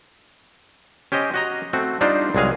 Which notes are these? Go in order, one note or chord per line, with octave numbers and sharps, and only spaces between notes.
C#4 G4 C5 D#5
F#4 D#5 A#5
A3 C4 F#4
G3 D4 D#4 F4 C5 D5
C2 F#3 G#3 G#4 F5